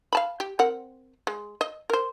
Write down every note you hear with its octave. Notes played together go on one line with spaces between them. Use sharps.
F5 A5 B5
G4
C4 A#4 F#5
G#3
D#5
A#4 C5